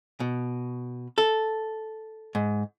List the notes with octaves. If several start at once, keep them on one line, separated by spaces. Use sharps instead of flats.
B2
A4
G#2